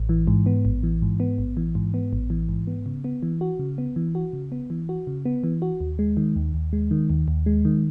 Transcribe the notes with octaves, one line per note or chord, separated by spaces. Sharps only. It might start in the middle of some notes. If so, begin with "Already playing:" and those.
Already playing: A1
E3
G#2
B3
A1
E3
G#2
B3
A1
E3
G#2
B3
A1
E3
G#2
B3
C#3
B3
E3
F#4
C#3
B3
E3
F#4
C#3
B3
E3
F#4
C#3
B3
E3
F#4
D#2
G#3
D#3
D#2
D#2
G#3
D#3
D#2
D#2
G#3
D#3